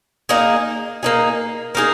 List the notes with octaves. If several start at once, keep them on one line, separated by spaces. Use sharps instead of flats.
A#3 D#4 G#4
A#3 D#4 G#4
A#3 D#4 G#4